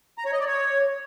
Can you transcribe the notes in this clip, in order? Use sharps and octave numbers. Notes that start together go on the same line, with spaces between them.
A#5
C#5
D#5
D5
C#5